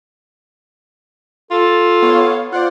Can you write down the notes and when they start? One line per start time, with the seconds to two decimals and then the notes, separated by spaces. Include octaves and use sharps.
1.51 F4 A4
2.02 B3 C#5 F5
2.52 F4 C5 D5 F#5